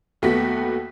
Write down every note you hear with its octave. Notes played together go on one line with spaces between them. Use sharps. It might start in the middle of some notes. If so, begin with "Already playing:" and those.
D#2 A3 B3 F#4 B6